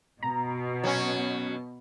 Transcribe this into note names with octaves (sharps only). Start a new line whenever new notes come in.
B2 A#5
F#3 C#4